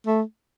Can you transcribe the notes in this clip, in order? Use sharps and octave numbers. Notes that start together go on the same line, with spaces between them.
A3